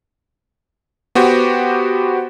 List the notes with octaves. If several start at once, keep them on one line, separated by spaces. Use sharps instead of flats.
B3 F#4 G4 C5